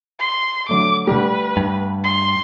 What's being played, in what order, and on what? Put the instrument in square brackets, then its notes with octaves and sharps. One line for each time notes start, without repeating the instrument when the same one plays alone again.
[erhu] C6
[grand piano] D3 F#3 A3 [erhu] D6
[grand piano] D2 G3 [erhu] B4
[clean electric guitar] G2
[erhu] C6